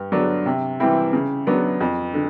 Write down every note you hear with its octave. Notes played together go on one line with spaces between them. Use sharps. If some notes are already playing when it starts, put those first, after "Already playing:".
Already playing: G2
D3 F#3 B3 D4
C3
E3 G3 C4 E4
C#3
F#3 B3 D4
F2
D3